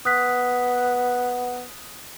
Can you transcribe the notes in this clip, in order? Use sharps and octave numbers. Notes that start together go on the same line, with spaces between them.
B3 D#6 F#6 B6